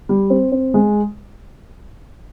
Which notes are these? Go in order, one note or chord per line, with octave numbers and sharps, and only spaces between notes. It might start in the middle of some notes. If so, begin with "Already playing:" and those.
G3
C4
C4
G#3